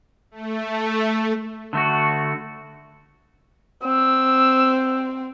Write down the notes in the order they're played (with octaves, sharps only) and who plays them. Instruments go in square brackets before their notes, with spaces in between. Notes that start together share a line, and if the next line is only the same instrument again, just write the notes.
[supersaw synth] A3
[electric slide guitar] D3 A3 F#4
[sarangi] C4 [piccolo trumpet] E6